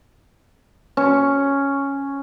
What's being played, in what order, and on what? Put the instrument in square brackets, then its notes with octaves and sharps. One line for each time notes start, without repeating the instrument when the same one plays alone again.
[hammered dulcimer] C#4